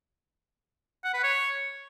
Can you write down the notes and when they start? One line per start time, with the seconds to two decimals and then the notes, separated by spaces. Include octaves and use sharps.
1.04 F#5
1.14 B4
1.23 C#5